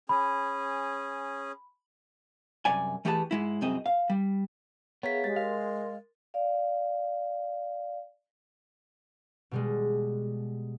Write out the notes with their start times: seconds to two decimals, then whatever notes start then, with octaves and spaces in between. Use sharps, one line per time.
0.09 C#4 G#4 B5
2.65 C2 F#2 D5 G#5
3.05 E3 A3 G4 G#4 B4 A5
3.31 G#2 G#3 E4
3.61 C2 F#2 C4 G#4 D#5
3.86 F5
4.10 G3
5.03 B3 G#4 A#4 C#5 E5 F5 B6
5.24 G#3 G4 A6
5.36 A#4 F5 C6
6.34 D5 F5
9.51 B2 G3 G#3